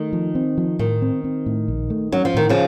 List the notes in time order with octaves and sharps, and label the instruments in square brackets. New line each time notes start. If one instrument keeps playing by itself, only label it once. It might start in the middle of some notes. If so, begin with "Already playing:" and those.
Already playing: [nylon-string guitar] D#3 [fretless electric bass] A3
[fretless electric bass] F3
C4
F3
[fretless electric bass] A2 [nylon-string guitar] D#3
[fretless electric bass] C4
C4
A2
A#1
A3
[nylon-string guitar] F#3 [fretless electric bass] C#4
[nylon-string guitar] F3
[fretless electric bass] A2 [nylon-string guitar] D#3
[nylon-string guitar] C#3 F3